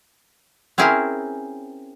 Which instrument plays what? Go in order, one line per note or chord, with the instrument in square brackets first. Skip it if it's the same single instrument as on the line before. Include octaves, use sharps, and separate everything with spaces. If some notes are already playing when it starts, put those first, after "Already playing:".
[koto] C4 C#4 E4 G#4 A#4